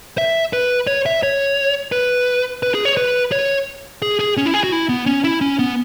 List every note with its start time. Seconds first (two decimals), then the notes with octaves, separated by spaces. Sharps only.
0.18 E5
0.53 B4
0.87 C#5
1.06 E5
1.23 C#5
1.92 B4
2.63 B4
2.75 G#4
2.85 C#5
2.97 B4
3.32 C#5
4.02 G#4
4.19 G#4
4.37 C#4
4.46 E4
4.54 G#4
4.64 F#4
4.72 E4
4.89 B3
5.06 C#4
5.24 E4
5.41 C#4
5.59 B3